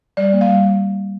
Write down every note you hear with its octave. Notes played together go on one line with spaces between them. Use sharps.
G3 D5
A#3
F5
G3